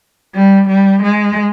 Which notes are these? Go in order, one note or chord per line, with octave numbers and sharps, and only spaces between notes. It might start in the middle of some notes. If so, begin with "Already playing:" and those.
G3
G3
G#3